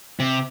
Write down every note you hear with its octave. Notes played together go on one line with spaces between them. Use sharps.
C3